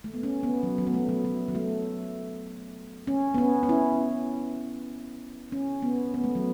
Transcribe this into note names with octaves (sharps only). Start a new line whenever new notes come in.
A3
B3
C#4
B3
F#3
F#3
B3
A3
F#3
F#3
F#3
A3
C#4
B3
C#4
C#4
E4
C#4
B3
B3
A3
F#3